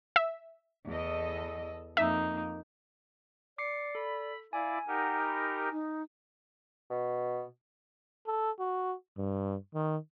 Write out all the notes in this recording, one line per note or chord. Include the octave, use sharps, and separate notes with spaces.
E5
E2 A4 D#5
F2 A#3 D#4 E5
D5 D6 C7 C#7
A4 B5
E4 D5 F5 G#5
D#4 G4 A#4 F#5
B5
D#4
B2
A4
F#4
G2
D#3